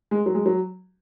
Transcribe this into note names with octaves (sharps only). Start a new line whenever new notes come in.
G#3
F#3
G#3
F#3